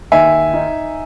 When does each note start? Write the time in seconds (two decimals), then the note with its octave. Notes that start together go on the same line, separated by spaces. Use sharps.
0.12 D#2 E5 G#5
0.54 D#4